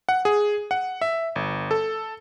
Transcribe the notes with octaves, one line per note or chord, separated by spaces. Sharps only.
F#5
G#4
F#5
E5
G1
A4